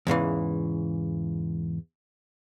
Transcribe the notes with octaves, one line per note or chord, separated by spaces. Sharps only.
E2 G#2 C#3 E3